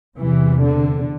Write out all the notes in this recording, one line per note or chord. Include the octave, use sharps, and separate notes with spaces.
E2 C3 E3
D3